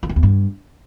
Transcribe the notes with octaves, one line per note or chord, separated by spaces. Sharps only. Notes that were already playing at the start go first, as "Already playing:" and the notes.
F2
F#2
E2
G2